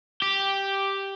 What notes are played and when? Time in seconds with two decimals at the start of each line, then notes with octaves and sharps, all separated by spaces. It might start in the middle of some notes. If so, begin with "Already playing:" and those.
0.22 G4